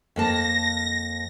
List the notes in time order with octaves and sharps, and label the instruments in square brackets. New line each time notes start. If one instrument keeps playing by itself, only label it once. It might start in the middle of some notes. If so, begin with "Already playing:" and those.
[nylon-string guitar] F2 A#3 A5 [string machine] A#6